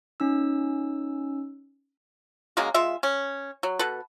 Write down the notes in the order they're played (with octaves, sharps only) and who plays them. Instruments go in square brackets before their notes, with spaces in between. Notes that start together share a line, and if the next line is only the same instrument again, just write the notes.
[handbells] C#4 D#4 E6
[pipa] C#3 F#3 G#3 A#3
G#3 F4 E5
C#4
F#3
B2 A4 B4